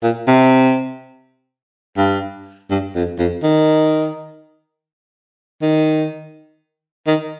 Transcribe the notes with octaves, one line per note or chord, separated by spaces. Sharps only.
A#2
C3
G2
G2
F2
F2
D#3
D#3
D#3